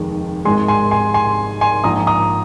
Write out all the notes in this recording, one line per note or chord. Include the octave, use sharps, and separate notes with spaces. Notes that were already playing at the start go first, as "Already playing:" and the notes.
Already playing: F1 D#2 D#3 G#3
G#1 G#2 G#3 G#5 C6
G#5 C6
G#5 C6
G#5 C6
G#5 C6
A#1 G#2 F3 A#5 D#6
A#5 D#6